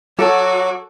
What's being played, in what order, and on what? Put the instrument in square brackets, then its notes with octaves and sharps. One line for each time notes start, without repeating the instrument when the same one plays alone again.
[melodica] F#3 D6 [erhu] F#4 [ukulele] A4 [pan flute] C#5